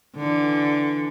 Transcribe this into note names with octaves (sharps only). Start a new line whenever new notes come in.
D3 E3